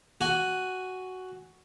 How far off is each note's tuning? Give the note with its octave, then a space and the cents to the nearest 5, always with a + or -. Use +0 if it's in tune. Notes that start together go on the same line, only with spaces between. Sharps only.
F#4 +5 G#5 +0